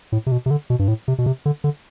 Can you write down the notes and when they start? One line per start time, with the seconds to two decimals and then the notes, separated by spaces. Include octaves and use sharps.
0.12 A2
0.26 C3
0.32 B2
0.46 C3
0.51 D3
0.70 B2
0.79 G2
0.88 A2
1.08 C3
1.18 B2
1.26 C3
1.46 D3
1.64 D3